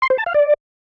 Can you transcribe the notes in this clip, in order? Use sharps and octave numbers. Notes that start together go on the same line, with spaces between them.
C6
C5
A5
F5
D5